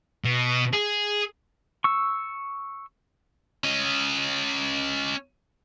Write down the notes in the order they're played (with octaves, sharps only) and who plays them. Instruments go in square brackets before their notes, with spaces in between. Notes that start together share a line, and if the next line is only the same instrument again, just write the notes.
[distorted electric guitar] B2
G#4
[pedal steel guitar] C#6 E6
[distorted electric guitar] C#4 D#5